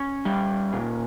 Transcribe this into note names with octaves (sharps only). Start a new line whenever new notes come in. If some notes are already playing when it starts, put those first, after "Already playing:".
Already playing: C#4
G3
A#2